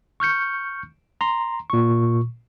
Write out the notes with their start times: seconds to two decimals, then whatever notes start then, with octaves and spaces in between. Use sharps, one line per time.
0.20 C#6 F6 G6 C#7
1.21 A#5 C6
1.70 A#2 C#6